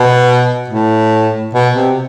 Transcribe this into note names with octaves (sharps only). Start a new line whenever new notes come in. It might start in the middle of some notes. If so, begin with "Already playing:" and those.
Already playing: B2
A2
B2
C3